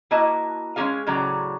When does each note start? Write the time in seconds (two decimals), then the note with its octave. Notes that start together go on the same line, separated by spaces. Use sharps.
0.11 A#3 E4 F#4 D#5 A5
0.76 G#3 C#4 D#4 G4 G#4 F5
1.07 A2 C#3 F#3 D5 A#5